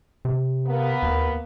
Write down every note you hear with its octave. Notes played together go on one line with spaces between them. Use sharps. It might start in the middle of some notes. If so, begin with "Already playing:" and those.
C3
A#3 B3
D#2